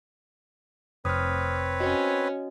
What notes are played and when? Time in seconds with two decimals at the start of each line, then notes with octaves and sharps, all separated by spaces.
1.05 F1 C4 B4 C#5 D#6 F6
1.80 C#4 F#4 D#5